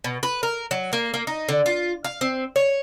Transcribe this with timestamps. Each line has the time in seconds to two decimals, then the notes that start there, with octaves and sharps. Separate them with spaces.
0.04 B2
0.23 B4
0.43 A#4
0.71 F#3
0.93 A#3
1.14 A#3
1.27 D#4
1.49 D3
1.66 F4
2.04 F5
2.21 C4
2.56 C#5